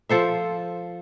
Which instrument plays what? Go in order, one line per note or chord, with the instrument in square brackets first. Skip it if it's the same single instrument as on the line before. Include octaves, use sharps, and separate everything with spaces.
[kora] F3 A4 C5 E5